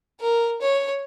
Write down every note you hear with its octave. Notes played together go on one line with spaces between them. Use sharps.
A#4
C#5